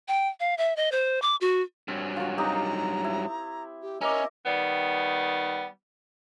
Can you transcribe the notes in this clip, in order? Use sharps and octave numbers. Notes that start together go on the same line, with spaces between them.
G5
F5
E5
D#5
C5
D6
F#4
G2 F#3 C4
F4 F#4
C4 D#4 G4 A#5
E4
G4
C#4 A#4 D#5 E5 D6
D#3 G3 B3